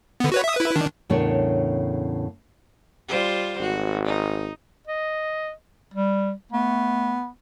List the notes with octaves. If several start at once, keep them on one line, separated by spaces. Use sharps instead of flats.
D3 B3
F#4 B4 C#5
E5 D#6
E4 B4
D#3 D4
E2 A2 C#3 D4 A#4 C#5
G3 F4 C5
G#1 F#4
D#4
D#5
G3
A3 B3